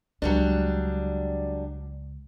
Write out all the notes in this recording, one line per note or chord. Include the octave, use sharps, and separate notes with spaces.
C#2 F#3 G3 D4